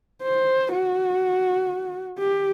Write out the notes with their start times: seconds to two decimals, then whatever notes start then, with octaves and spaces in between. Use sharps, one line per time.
0.23 C5
0.72 F#4
2.18 G4